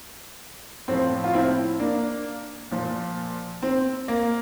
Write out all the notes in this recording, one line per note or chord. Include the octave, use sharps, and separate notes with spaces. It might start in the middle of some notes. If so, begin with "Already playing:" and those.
A2 F3 C4
F4
C4 E4
A#3 D4
A#2 F3
C4
A#3